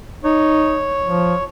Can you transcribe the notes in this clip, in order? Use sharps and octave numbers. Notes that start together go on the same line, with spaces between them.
D#4 C#5
F3